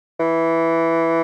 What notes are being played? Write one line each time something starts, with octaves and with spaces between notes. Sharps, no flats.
E3